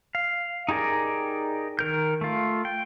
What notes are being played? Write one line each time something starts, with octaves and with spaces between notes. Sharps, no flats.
F5
D#4 G4 G#4 A#4 D5
D#3 A#4 G6
A3 F4
G5